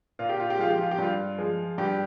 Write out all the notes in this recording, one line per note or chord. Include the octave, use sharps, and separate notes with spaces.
A#2 F4
G4
F4
G4
F3 G#3 F4
G4
F4
G4
G2 F4
F3 G#3
G2 G4